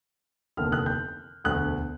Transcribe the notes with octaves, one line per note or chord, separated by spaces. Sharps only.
F1 D#2 D3 F6
F#6
G6
E1 D2 D3 F#6